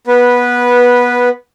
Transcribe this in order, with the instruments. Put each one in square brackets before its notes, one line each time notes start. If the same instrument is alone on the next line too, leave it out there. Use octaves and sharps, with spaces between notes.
[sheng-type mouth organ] B3 B4